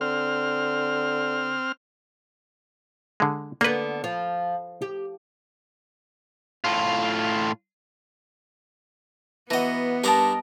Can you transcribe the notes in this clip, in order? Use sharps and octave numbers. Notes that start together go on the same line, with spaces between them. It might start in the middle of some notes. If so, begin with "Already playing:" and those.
D3 C4 F6
D3 G#3
D3 A#3 B3 B4
F3
G4
A2 F4
E3 B3 F#4 D#5 A#5
G2 D4 A#4 D#5 A5 A#5